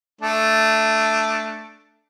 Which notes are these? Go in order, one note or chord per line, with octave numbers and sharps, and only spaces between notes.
A3 D4